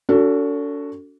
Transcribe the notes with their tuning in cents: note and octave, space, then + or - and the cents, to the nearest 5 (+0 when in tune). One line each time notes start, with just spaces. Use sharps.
D4 -45 F#4 +0 A4 +25